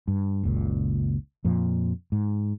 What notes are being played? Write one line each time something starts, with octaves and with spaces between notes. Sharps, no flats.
G2
F#1 C#2 A#2
F2 A#2 F3
G#2